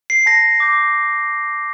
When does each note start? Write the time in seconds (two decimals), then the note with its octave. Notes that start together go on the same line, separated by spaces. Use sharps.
0.10 C7
0.26 A5 A#6
0.60 D6 G6